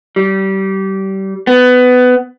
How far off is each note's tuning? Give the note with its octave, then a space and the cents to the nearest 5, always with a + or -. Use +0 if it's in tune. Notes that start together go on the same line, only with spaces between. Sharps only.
G3 -25
B3 +20